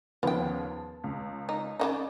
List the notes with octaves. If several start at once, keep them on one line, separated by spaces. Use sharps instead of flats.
D#2 C#3 F3 B3 G5
A5
C#2
D#4
C#3 E3 D#4 D5